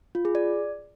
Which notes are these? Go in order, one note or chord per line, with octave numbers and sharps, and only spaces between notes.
F4
G#4
D5